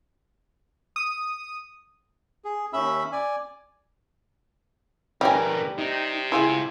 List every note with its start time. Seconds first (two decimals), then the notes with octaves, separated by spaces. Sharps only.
0.96 D#6
2.45 G#4
2.73 D#2 C#4 E5 B5 E6
3.12 D5 G#5
5.21 D3 G3 C#4 G4 A#4 B4 G#5
5.78 C3 D#4
6.32 C#2 E4 F4 G#4 G#5